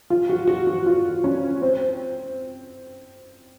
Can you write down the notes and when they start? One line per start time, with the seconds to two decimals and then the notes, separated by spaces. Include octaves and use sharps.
0.10 F4
0.29 F#4
0.47 F#4
0.67 F#4
0.86 F4
1.24 C#4
1.62 C4